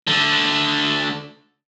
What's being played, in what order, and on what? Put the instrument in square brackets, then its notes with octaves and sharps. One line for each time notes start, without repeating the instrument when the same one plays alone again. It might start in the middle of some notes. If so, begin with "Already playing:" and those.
[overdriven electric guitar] D3 A3